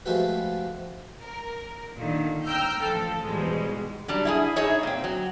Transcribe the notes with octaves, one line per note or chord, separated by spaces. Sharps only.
F3 G#3 A3 F#4 G4 B4
A#4
A#2 D3 D#3
G5 A#5 E6 F6 G6
A1 F3 A4
E2 G#2 B2 G3 G#3
F#3 G3 D4
E4 F4 G#4
D#4 G#4 C#5 E5
A#2 C4
F#3